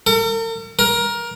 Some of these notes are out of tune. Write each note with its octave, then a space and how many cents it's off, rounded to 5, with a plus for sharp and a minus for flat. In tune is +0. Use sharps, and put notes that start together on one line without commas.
A#4 -45
A#4 +20